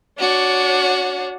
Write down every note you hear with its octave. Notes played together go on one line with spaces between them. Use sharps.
D4 F#4 C#5